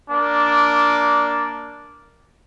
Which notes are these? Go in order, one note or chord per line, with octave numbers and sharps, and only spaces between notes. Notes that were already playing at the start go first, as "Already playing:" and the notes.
A#3 D4